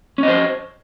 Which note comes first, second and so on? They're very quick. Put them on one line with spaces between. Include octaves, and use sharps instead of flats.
C#4 D#5 C5